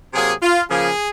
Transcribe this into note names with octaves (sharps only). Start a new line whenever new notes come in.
C3 F#3 A#3 G#4
F4
C#3 F3 A#3 G#4